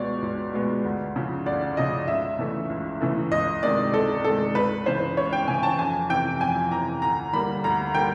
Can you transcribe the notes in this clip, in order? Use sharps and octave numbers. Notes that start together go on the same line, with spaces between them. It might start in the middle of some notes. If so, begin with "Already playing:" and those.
Already playing: C#2 B2 G#3 B3 C#5 D5
C#2
B2 G#3 B3
D2
C#3 F3
D2 D5
C#3 F3 D#5
C#2 E5
C#3 E3 A3
C#2
C#3 E3 A3
C#2 D#5
C3 D#3 G#3 D5
C#2 A4
C3 D#3 G#3 A4
C#2 B4
C#3 E3 C5
C#2 C#5
G5
C#3 E3 G#5
A5
F2 G#5
C3 E3 G5
F2 G#5
C3 E3 A#5
D2 A#5
D3 G3 A#3 B5
D2 A#5
D3 G3 A#3 G5